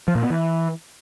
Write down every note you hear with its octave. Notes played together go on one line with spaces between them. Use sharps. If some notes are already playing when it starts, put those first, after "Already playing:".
F3
A#2
B3
E3